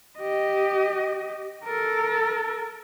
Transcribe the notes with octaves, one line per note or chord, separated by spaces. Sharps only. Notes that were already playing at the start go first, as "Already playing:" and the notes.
G4 D#5
A4 A#4